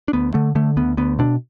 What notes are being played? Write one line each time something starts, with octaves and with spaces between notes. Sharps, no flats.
D4
D2 B3
D3 A3
D3 A3
D2 B3
D2 B3
B2 D4